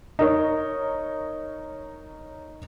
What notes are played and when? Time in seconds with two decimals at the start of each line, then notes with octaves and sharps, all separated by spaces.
0.19 D#4 A#4 C#5